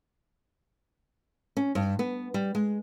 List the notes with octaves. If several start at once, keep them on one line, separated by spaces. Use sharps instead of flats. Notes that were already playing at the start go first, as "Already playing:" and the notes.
C#4
G2
B3
G3
G#3